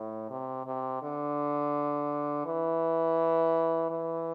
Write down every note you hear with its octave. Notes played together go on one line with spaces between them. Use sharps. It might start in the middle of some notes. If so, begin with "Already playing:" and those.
Already playing: A2
C3
C3
D3
E3
E3